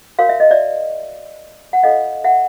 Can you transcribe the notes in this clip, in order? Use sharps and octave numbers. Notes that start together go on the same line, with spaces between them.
F#4 A#4 C#5 F5
E5
D#5
D5 E5
F#5
C#4 F4 A4 C#5 D#5 F5
E5 F#5